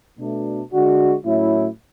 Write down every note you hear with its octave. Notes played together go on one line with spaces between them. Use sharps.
B2 A3 D4
D3 G#3 D4 F#4
A2 F#3 C#4 E4